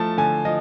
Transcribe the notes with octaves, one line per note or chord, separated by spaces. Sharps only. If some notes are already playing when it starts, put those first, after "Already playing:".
Already playing: F3 A3 A5
D3 G#5
F3 D#5